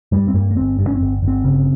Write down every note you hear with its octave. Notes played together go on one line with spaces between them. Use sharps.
G2 G3
C4
G2 A#3
A#3
G1 C4
G2
C#4
C4
G1
G1
C4
C#3